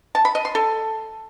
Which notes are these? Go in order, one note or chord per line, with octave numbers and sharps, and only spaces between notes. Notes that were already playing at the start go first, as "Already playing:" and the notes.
A5
B5
D#5
C6
A4